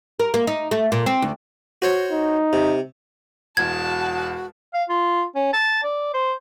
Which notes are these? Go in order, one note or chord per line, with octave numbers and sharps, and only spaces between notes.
A#4
A#3
D#4
A3
A#2
C4
D2
F#4 C5 C#5
D#4
C3
E1 E2 F#4 A5 G#6
F5
F4
C#4
A5
D5
C5